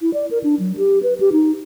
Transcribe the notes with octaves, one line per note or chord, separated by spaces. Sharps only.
E4
D5
A#4
D4
F#3
G4
B4
G4
D#4